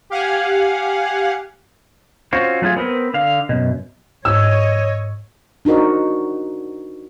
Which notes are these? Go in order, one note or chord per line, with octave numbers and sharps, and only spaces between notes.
G4 F5 F#5 G#5
C4 C#4 F4 F#4 C5
F#3 A3 F4 G#4
B3 C4 A#4 B4
D3 F5
F#2 B2
G#2 C#5 D#5 E6
D4 D#4 F#4 A#4 C5